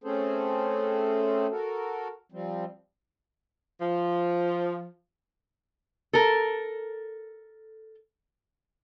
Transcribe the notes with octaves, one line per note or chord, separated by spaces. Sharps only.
A3 C4 C#4 G#4 A4 C5
F#4 A4 A#4
F3 G3 C4
F3
A4 A#4